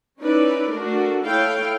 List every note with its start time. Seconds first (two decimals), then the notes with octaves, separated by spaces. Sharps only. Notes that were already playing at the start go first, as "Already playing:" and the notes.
0.21 C#4 D#4 E4 B4 D5
0.71 A3 D4 F#4 A#4
1.24 E4 A4 C#5 F5 G5